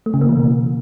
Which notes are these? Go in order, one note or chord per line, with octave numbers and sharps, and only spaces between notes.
A3
C#3
A#3
E3
B2